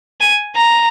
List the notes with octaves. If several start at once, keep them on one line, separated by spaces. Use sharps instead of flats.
G#5
A#5